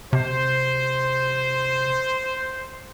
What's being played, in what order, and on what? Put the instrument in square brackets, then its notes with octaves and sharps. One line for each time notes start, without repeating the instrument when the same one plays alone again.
[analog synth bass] C3 [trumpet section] C5